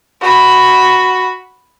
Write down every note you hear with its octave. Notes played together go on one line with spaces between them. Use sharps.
F#4 B5